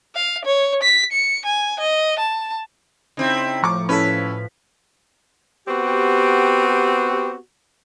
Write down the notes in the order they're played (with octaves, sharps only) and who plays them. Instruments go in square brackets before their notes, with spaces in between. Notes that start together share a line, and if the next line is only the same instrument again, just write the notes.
[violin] F5
C#5
B6
C#7
G#5
D#5
A5
[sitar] C#3 C4 E4 [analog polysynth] D#4
[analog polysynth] A2 F3 [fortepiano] A#5 C#6 D6
[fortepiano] C#4 E4 A4 [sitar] B4
[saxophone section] B3 C4 F#4 G4